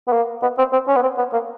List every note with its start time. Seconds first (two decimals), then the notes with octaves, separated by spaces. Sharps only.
0.08 B3
0.13 A#3
0.43 B3
0.58 C4
0.73 C4
0.88 C#4
0.96 B3
1.03 C4
1.18 B3
1.33 A#3